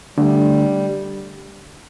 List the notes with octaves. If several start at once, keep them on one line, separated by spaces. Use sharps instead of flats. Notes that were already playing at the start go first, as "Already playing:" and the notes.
D3 G3 A3 D4